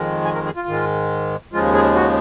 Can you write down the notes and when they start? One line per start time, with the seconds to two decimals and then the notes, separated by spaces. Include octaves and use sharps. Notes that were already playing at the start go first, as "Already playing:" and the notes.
Already playing: F2 D#3 G#3
0.25 G#5
0.35 A#4
0.46 G#4
0.56 F4
0.68 G#2 D#3 G#3
1.53 D#2 C#3 F3 G#3 F4
1.74 G#4
1.96 F#4